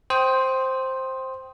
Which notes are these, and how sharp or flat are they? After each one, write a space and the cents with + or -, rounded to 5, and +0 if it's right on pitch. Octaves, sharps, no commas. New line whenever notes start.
C5 +5 G5 -10 D#6 +15